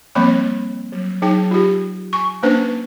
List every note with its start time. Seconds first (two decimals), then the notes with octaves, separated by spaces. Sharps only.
0.15 F3 G3 A#3 C4 C#5 B5
0.92 F#3
1.22 F#3 D#4 G#4 G5
1.51 F4 G4
2.13 G#5 C#6
2.43 A#3 C#4 D4 B4 C5